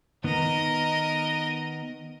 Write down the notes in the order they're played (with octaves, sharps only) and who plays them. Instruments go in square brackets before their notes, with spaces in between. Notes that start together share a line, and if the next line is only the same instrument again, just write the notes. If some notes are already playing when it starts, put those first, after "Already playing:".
[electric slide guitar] D#3 B3 [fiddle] A#4 D#5